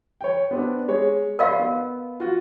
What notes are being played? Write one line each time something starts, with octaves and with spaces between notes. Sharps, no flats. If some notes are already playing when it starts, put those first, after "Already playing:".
C#5 G5
B3 C4 D4
G#3 C#5
A#4 D#5 F5 B5 C6
B3
F4 F#4